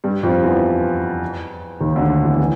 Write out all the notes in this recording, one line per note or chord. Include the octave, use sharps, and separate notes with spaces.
G2 G3
F2 F3
E2 E3
D#2 D#3
D2 D3
E2 E3
E3